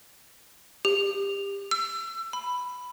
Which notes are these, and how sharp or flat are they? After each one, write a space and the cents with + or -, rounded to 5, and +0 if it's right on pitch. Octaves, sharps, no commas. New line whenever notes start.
G4 +25
E6 +25
B5 +5